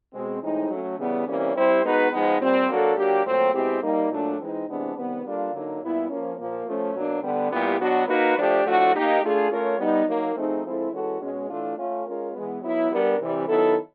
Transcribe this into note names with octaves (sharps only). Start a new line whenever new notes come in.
B2 G#3 C4
A2 E3 G#3 C4 D#4
F#3 A3 C#4
C#3 E3 G3 B3
C3 E3 G3 A#3 C#4
G3 C4 E4 G4 C5
G#3 B3 D#4 F#4 B4
F3 G#3 B3 D#4
A#2 G3 C4
F#3 A#3 D4 F#4 A4
F#3 A#3 D4 G4
A#2 F#3 A3 C4
B2 G#3 C4 E4 G4
G3 A#3 D#4
A#2 F#3 A3 D4
E3 G#3 C4 D#4
C3 E3 G#3 B3 D4
C3 D#3 G3 B3
G3 A#3 D4 F4 A4
D3 F#3 A#3 D#4
A#2 G3 B3 E4
F3 A#3 C#4
A#2 F3 A#3
F3 A3 C#4
B2 F#3 A#3 D4
D3 G3 B3
A#2 G3 B3 E4 G4
B2 F#3 B3 D4 F#4
A#3 D#4 F#4 B4
F3 A3 D4 G4
A2 F3 A3 D4 F#4
A#3 D#4 G4
A3 D4 F4 G#4
A3 C#4 F4 A#4 C#5
G3 B3 D#4
F#3 A#3 D#4
F3 A3 C4 D#4 G#4
F3 G#3 C4 E4 A4
E3 G#3 C#4 F#4 A4
B2 G#3 C#4
A2 E3 A3 D4 F4
A3 C#4 F4
G#3 C#4 F4 A#4
E3 G#3 B3
F#3 B3 E4
G3 B3 D4 G4 A#4
C3 E3 G3
D#3 F#3 B3 E4 A4